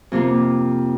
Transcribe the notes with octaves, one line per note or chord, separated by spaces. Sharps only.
F2 C3 F3 A#3 F4